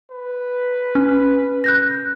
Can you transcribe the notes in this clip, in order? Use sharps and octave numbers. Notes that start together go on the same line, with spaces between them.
B4
C#4
F#6 G6 A#6